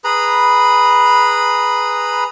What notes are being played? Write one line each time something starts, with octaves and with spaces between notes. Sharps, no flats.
G#4 B4 A#5 B5